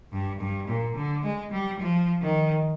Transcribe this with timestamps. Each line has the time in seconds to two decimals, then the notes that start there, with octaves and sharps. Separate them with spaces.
0.12 G2
0.40 G2
0.68 A#2
0.96 D3
1.23 G#3
1.51 G3
1.79 F3
2.21 D#3